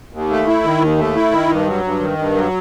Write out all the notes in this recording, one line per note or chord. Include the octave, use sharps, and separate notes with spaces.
D#2
A3
E4
D#3
D#2
A3
E4
D#3
G2
F#3
G2
D#3
G2
F#3